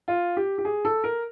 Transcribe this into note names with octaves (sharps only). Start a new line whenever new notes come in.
F4
G4
G4
G#4
A4
A#4